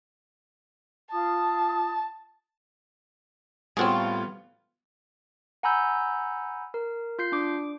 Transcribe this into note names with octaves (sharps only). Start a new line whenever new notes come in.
F4 A5 D#6
A2 G3 B3 C4 F4 F#4 G#4 C#5
F#5 G#5 A#5 B5 E6 G6
A#4
F4 G6 C7
D4 D6